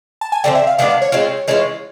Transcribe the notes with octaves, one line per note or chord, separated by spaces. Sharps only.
A5
G#5
D3 F3 A3 C4 G5
E5
F5
D#3 G#3 B3 D4 F5
F5
C#5
G#3 C4 F4
E3 G#3 C#4 F4